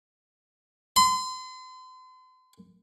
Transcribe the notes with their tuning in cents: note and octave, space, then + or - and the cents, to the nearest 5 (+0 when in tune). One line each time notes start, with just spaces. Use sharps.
C6 -40